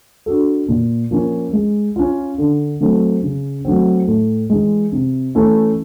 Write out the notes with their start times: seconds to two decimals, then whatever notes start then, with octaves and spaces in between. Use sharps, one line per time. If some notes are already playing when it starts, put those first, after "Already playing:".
0.26 D4 F#4 A4
0.68 A#2
1.11 F3 A#3 C#4
1.53 G#3
1.96 C#4 F4
2.38 D3
2.80 F#3 A3 C4
3.23 C#3
3.65 F#3 A3 C4
4.07 A2
4.50 E3 G#3
4.92 C3
5.35 E3 A3 C#4 E4